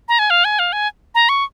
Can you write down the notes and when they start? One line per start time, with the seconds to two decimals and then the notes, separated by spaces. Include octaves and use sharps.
0.08 A#5
0.19 G#5
0.30 F5
0.45 G#5
0.59 F5
0.73 G#5
1.15 A#5
1.29 C#6